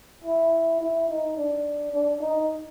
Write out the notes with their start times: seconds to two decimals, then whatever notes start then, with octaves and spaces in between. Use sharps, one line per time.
0.25 E4
0.81 E4
1.09 D#4
1.37 D4
1.93 D4
2.20 D#4